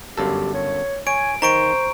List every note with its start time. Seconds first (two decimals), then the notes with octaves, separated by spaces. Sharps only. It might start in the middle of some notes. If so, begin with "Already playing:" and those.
0.18 G1 F#2 G4 A4
0.54 C#5
1.07 C#5 G#5 D7
1.42 D#3 C5 A#5 C#6 D7